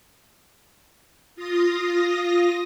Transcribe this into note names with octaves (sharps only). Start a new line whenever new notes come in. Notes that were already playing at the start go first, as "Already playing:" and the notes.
F4 D#6 A#6